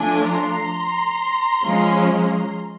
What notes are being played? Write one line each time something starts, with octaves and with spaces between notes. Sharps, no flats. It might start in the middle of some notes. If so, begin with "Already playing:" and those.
Already playing: F3 A3 D4 G#5
A#5 C6
F3 G#3 C#4